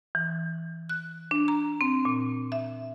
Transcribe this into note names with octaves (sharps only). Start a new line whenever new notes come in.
E3
F#6
D4
A#5
C4
A#2
E5